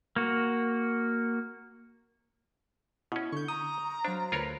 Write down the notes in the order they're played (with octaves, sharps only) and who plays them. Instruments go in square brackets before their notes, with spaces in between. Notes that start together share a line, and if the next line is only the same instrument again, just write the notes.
[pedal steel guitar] A#3 F#4
[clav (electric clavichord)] B2 C#4 [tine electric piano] E4
[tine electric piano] D3 [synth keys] C#6 G6
[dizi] A#5 [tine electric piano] D#6
[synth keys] F#3 F5 [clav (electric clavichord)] D4 [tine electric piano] C5
[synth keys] D2 D3 B4 [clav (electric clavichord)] F4 A#4 C#5